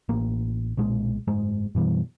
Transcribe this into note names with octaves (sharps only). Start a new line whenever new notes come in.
A1 A#3
B1 A#2 G#3
F#1 G#2 G#3
F#2 B2 E3 G3